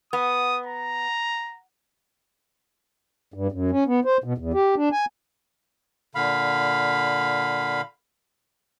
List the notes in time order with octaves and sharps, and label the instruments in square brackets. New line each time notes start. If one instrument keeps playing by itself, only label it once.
[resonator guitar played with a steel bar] B3 [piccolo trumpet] D#6
[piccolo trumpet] A#5
[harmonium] G2
F#2
C#4
B3
C5
B2
E2
G4
D4
G#5
[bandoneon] A#2 D3 F5 B5